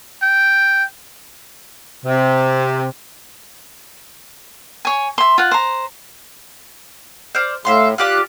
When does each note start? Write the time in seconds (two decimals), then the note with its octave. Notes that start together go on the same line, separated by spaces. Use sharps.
0.23 G5
2.04 C3
4.85 C#5 G#5
5.18 E5 C6
5.38 F4 F#5
5.51 C5 A#5
7.35 C5 D5 F6
7.65 A2 E5 F5 C6
7.98 F4 G4 D5 F#6